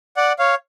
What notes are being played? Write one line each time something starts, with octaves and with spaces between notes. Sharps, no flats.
D5 F#5
C#5 F5